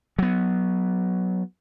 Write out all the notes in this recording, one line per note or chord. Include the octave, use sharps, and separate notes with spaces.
F#3 B3